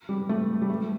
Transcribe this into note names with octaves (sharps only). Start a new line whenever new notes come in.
G3
A3
G3
A3